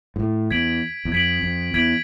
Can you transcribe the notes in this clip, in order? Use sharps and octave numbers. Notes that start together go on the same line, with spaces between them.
G#2
A2
E2 G#6 B6 D7 F#7
E2
F2 G#6 B6 D7 F#7
F2
E2 G#6 B6 D7 F#7